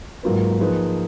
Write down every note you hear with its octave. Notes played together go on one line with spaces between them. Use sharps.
G#2 F#3 A#3 F4 B4
F3 A#3 D#4 G#4 B4